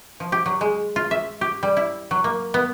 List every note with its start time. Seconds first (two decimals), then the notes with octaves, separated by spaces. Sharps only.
0.20 F3
0.32 G4
0.46 F#3
0.61 G#3
0.96 F4
1.11 E5
1.41 G4
1.63 G3
1.77 E4
2.11 F#3
2.24 A#3
2.54 B3